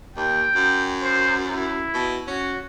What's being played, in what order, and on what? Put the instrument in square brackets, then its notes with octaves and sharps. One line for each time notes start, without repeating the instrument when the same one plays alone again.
[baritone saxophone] D#2 [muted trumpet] G5
[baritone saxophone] F#2
[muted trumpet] C5
E4
[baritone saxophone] B2
[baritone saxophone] C#4 [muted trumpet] F#4